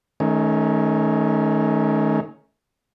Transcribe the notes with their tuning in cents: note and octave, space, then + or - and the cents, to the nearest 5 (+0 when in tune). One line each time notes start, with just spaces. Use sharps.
D#3 +0 A3 -35 C#4 +0